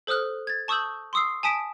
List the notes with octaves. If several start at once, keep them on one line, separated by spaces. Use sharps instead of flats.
A4 C5 D#6 F6 F#6
G#6 A6
A5 C#6 D#6 E6 G6 F#7
C6 C#6 D#6 E6 C7
G#5 A5 D#6 B6 D7